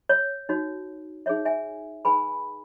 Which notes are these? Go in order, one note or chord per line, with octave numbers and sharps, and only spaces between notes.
C#5
D#4 F#4 C#5
D#4 G#4 C#5 E5
E5 G#5
D#4 G#4 B4 G#5 B5